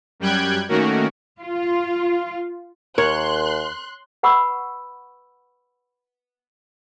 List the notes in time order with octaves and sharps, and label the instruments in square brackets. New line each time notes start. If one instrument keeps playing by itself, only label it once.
[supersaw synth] F#2 G3 G5 F#6 G#6
D#3 A3 A#3 C#4 F#4 A#4
[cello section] F4
[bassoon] D#2 [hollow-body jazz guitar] A#4 [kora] C#5 [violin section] C6 F#6
[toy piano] B4 F#5 B5 C#6 E6